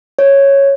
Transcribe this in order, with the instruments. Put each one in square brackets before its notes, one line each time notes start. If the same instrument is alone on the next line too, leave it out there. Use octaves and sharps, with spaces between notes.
[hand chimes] C#5